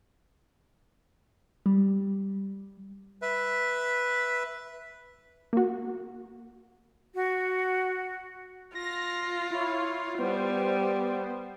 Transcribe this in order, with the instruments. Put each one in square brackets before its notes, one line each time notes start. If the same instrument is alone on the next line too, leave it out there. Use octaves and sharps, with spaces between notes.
[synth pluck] G3
[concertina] B4 E5
[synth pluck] A#3 F#4
[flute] F#4
[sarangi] F4 [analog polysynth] A#6
[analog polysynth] E4 C#5
[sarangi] G3 [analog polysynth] B3 C5